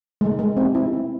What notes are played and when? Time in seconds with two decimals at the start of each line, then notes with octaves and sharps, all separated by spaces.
0.21 G#3
0.39 G#3
0.57 C4
0.75 E4
0.93 C4